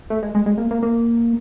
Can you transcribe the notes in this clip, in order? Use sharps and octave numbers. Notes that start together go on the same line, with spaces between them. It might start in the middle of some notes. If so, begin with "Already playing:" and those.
A3
G#3
G#3
G#3
A#3
A#3
A#3